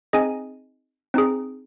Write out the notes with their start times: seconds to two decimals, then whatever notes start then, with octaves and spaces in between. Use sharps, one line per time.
0.13 C4 D#4 G#4 D#5 G#5
1.14 C4 D#4 G#4